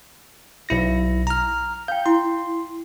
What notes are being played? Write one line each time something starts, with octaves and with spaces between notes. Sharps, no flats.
B1 E4 A#6
A#5 F6
F5 G5 G6
E4 C6